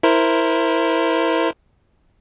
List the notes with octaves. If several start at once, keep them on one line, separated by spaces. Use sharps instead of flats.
E4 A#4 C5